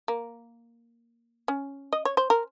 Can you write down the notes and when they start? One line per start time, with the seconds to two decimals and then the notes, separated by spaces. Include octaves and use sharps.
0.08 A#3
1.48 C#4
1.93 D#5
2.05 C#5
2.17 C5
2.30 A#4